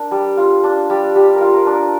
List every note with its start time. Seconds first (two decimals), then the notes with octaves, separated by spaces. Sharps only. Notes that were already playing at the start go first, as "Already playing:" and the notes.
Already playing: D4 A#4
0.11 G3
0.37 F4
0.64 D4
0.90 G3
1.15 G3 G4
1.35 A#4
1.41 F4
1.54 A#4
1.66 D4
1.74 A#4